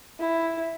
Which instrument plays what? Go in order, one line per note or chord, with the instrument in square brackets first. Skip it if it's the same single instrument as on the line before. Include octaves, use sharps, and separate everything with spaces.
[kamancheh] E4